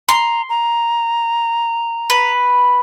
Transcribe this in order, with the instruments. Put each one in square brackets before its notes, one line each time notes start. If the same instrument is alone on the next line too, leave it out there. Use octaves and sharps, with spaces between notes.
[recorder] A#5 [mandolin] C6
[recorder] A#5
[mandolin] B4